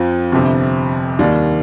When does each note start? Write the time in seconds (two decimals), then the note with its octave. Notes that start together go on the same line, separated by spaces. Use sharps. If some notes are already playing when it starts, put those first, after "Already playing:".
Already playing: F2 F3 C4 F4
0.32 G1 F2 C3
1.19 D#2 D#3 G3